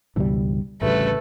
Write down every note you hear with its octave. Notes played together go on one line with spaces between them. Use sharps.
C#2 G2 B2 E3 G3
A1 D2 C#3 G3 A3 B4